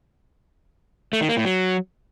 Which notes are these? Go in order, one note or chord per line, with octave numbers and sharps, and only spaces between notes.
A3
D#3
A#3
A2
F#3